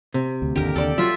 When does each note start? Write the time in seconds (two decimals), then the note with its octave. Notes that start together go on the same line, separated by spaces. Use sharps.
0.14 C3
0.42 D2
0.56 G#1 D#2 D3 G4 A#4
0.76 D#2 D3 A4 D5
0.98 F#3 F4 E5